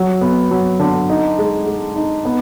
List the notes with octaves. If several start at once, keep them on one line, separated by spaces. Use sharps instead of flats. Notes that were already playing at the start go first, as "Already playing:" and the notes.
Already playing: F#3
B3
F#3
D3
D#4
G#3
G#3
D#4
B3